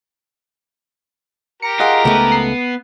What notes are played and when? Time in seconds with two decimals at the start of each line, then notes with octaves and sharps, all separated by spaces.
1.62 G4 A#4 A#5 C#7
1.80 F4 G#4 D#5 F#5
2.05 C#2 A3 B3
2.32 C7